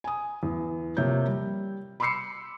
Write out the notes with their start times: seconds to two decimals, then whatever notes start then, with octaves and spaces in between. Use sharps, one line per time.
0.04 G#5 D#6
0.43 E2
0.97 C3 F3 A#3 C#5 G6
1.27 G3
2.00 B5 C6 D6 E6 C7 C#7